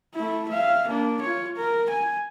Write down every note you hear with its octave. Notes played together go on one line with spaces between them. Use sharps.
A3 E4
E5 F5
A#3 D4
F4 C#5
A#4
G#5